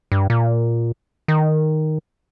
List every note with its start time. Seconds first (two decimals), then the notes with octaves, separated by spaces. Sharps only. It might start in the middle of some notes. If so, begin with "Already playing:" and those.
0.12 G2
0.30 A#2
1.28 D#3